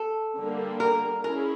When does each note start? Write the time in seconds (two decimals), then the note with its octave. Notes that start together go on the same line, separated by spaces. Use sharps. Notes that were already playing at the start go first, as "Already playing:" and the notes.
Already playing: A4
0.36 D3 G3 A#3
0.80 A#4
1.23 C#4 E4 G#4 A#4